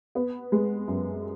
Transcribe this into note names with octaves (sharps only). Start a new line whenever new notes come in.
B3
G#3
F#2